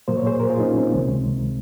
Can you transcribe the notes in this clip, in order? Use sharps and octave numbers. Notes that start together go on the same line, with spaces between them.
A#2 F#3 A#3 C5
C#5
G#4 C5
A#4
F4 G#4
D#4
C#4
C4
C#2 C3 D#3 G#3